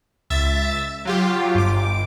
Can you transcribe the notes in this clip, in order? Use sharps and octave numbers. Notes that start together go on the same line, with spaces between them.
C#2 E5 A6
F#3 F4 G4
G1 D6